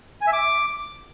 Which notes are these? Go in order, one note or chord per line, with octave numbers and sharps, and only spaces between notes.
G#5
E5
D6